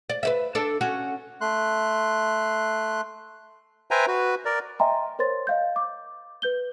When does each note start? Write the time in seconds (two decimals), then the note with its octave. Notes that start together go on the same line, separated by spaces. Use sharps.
0.10 D5
0.23 B4 D5 E5
0.55 D4 A4
0.81 C#4 F#4
1.41 A3 C6 F#6
3.91 B4 C5 E5 G5 G#5 A#5
4.07 F#4 B4
4.45 A#4 D5
4.80 D#5 E5 G5 G#5 A#5 C6
5.19 A#4 C5 C#5 C6 A6
5.47 D#5 F5 G6
5.76 D6
6.42 B4 G6 G7